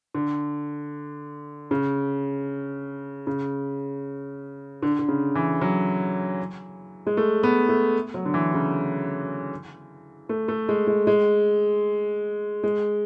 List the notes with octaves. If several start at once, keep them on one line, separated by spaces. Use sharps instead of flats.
D3
C#3
C#3
D3
D3
C#3
E3
F#3
G#3
A3
B3
A3
F#3
D3
E3
C#3
A3
A3
G#3
G#3
G#3
G#3